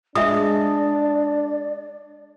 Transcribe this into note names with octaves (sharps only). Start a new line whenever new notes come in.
G#3 D4 D5 E5 D#6